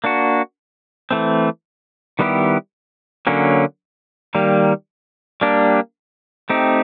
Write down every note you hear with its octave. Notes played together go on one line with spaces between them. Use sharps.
A#3 D4 F#4
E3 A3 C4
D#3 G3 B3 E4 G4
D3 F#3 A#3 C#4
D#3 G3 A#3
G3 A#3 D4 G4
A3 C4 D#4 G4